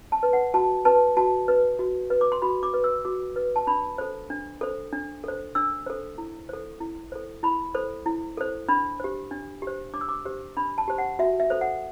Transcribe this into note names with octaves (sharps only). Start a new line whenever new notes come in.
A5
B4
F#5
F#4 A5
B4 A5
F#4 A5
B4
F#4
B4
D6
C6
F#4 B5
D6
B4
E6
F#4 D6
B4
A5
D4 B5
A4 C5
D4
A4 C5
D4
A4 C5
D4 E6
A4 C5
E4
A4 C5
E4
A4 C5
E4 B5
A4 C5
E4
A4 C5
D4 B5
G4 C5
D4
G4
C5
D4 D6
E6
D6
G4 C5
D4 B5
A5
G4 C5
F#5
F#4 E5
E5
A4 C5
F#5